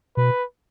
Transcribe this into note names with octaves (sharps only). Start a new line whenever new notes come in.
B2 B4